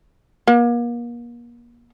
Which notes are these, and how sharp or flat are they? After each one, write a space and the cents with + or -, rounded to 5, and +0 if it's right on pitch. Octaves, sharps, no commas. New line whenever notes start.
A#3 +35